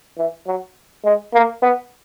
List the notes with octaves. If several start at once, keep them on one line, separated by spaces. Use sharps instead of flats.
E3
F#3
G#3
A#3
B3